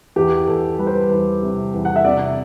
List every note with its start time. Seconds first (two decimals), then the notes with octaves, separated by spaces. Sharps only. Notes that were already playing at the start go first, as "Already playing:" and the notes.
0.16 E2 G4
0.47 E2 A4
0.78 G3 B4
0.87 C5
0.95 B4
1.10 E2
1.42 C3
1.74 E2
1.85 F#5
1.96 E5
2.05 C3 D5